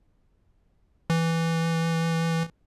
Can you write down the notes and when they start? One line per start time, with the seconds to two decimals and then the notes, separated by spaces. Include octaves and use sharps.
1.10 E3